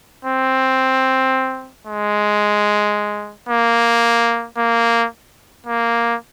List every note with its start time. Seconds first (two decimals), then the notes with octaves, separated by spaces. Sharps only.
0.25 C4
1.87 G#3
3.49 A#3
4.57 A#3
5.66 A#3